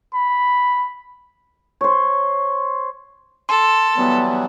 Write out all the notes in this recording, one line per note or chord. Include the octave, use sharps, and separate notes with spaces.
B5
C5 C#5
A4 C6
E3 F#3 G3 B3